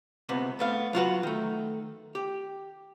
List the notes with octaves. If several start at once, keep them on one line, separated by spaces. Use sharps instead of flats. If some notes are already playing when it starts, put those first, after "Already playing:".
C#2 C3 B3
A3 B3 F5
F#3 F4 F#4 B4
D#3 A3
G4